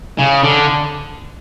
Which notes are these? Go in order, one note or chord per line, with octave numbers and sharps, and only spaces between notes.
C#3
D3